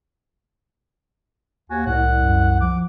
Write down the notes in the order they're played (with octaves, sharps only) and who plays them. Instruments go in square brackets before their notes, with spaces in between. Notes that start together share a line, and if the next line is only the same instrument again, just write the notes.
[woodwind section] D#2 G#5 [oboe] F#4
[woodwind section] C2 [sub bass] A2 [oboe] F#5
[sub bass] F#2
[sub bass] F3 [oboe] D6